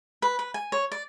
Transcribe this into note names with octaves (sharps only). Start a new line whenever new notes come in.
B4
B4
G#5
C#5
D5